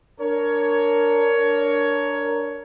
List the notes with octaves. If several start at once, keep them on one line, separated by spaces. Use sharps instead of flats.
D4 A#4 C#5